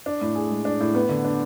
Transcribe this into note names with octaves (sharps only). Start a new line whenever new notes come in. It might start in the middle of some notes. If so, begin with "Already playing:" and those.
D4
A2
G#4
G#3
D4
A2
B3
D3
D4